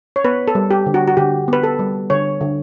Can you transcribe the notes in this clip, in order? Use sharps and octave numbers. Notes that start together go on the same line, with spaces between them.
C#5
B3 B4
A4
G3
G4
D3
F#4
F#4
D3 G4
B3 B4
A4
G3
D3 C#5
D3